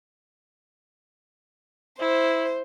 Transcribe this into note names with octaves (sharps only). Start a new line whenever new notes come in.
E4 C5